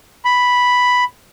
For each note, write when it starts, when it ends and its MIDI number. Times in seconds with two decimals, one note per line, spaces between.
0.25 1.04 83